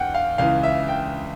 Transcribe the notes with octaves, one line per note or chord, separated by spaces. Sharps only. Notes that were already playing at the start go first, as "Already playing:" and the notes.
Already playing: E2 F#5 G5
F5
C#2 C#3 E3 F5
E5
G5